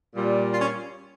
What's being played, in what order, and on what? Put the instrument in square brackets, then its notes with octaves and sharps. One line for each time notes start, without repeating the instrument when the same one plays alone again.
[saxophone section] A#2 G3
F4
C#4